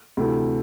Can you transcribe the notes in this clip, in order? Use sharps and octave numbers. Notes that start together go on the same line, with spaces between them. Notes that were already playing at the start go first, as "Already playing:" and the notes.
D2 C3 E3 A3